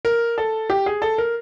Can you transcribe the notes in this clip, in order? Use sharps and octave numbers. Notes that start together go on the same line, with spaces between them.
A#4
A4
G4
G#4
A4
A#4